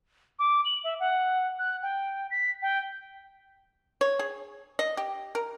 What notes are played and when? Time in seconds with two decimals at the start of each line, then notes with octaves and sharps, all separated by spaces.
0.39 D6
0.65 F#7
0.84 E5
1.00 F#5
1.59 F#6
1.83 G5
2.31 B6
2.62 G5
4.01 C#5
4.19 G#4
4.79 D#5
4.97 G4
5.35 A#4